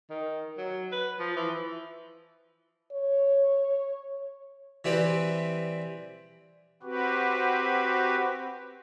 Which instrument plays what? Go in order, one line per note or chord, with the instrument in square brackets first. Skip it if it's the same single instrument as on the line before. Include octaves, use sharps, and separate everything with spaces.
[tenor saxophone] D#3
F#3
B4
F3
E3
[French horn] C#5
[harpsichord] E3 G3 C4 G4 B4
[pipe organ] C4 F#4 G4 B4